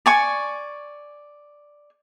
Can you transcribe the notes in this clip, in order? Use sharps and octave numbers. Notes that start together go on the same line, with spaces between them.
D5 G#5 C#6